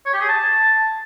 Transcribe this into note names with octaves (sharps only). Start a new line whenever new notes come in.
C#5
G4
G#4
A5